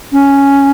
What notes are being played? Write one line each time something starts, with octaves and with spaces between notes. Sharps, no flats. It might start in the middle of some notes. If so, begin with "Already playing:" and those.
C#4